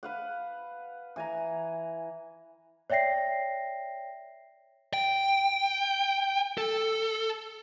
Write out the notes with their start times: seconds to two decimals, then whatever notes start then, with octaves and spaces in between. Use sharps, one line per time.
0.03 B4 F5 F#5
1.16 E3 G#5 A#5
2.90 C#5 D5 E5 G5 A#6 C7
4.94 G5
6.58 A4